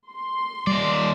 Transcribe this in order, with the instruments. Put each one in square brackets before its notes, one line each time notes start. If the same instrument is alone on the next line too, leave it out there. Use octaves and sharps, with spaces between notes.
[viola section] C6
[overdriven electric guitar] D#2 D5 [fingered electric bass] G3